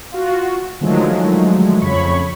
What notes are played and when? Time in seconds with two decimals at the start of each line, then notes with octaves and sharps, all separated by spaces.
0.12 F4 F#4
0.81 D3 D#3 F3 F#3 G#3 A3
1.81 F2 C#3 C#5 B5 C#6